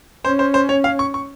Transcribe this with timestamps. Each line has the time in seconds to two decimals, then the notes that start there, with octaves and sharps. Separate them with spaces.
0.24 C#4 C5
0.39 C5
0.54 C5
0.69 C#5
0.84 F5
0.99 C#6
1.14 C#6